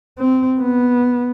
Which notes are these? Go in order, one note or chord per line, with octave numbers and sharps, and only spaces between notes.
C4
B3